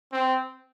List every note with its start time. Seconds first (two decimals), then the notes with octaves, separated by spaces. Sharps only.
0.12 C4